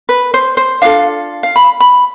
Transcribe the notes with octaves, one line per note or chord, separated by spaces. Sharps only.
B4
C5
C5
D4 F4 A4 F5
F5
B5
B5